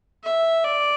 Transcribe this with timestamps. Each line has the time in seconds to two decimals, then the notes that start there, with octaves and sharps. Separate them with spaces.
0.24 E5
0.63 D5